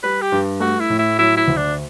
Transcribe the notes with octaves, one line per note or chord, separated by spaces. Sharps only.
G3 B4
G4
G2
A3 F#4
E4
A2
E4
F#3 E4
E4
D2
D4